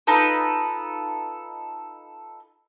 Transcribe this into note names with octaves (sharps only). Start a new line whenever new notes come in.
D#4 F4 A4 B4